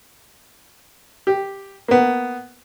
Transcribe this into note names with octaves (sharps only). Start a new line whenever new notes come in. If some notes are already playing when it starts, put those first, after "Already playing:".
G4
A#3 B3